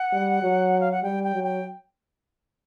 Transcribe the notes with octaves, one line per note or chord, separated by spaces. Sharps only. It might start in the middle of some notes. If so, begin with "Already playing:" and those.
Already playing: F#5
G3
F#3
F5
F#5
G3 G5
G5
F#3
G5